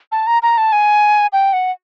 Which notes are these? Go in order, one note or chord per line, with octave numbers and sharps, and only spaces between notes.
A5
A#5
A#5
A5
G#5
G5
F#5